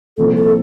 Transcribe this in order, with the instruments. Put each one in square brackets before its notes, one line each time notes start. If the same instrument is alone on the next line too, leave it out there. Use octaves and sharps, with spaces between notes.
[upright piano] C2 A#2 F3 C4 [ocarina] A4
[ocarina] A4